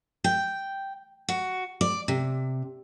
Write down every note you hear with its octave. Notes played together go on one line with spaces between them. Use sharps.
G5
F#4
D5
C3